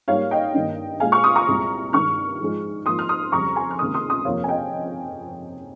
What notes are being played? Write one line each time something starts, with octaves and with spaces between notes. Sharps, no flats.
G#2 G3 A#3 C#5 F5
D#5 G5
G2 D#3 A#3
A#2 G#3 F5 G#5
C#6 F6
C6 D#6
A#5 C#6
C2 A#2 G#3
G2 D#3 G#3 C#6 F6
G#2 F3 G#3
G#2 F3 A#3 C6 D#6
F6
C6 D#6
F2 C#3 G3 A#5 C#6
G#5 C6
F6
C#2 C3 D#3 A#3 C6 D#6
C6 D#6
C6 D#6
F2 C3 F3 A#3 C#5 F5
G#5
D#5 G5